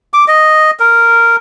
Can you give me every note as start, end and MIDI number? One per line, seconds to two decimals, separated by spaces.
0.13 0.25 86
0.28 0.71 75
0.80 1.36 70